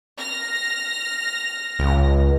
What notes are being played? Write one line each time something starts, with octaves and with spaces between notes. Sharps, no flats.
F6 A#6
C#2